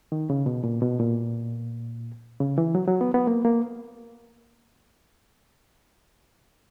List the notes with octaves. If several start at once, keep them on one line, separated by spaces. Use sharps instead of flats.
D#3
C#3
B2
A#2
B2
A#2
C#3
E3
F#3
F#3
B3
B3
A#3
A#3